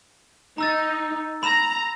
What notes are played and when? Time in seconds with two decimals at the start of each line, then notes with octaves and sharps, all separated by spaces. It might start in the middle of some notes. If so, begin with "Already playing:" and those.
0.58 D#4 A#5 E6 A6
1.43 A#5 B5 E7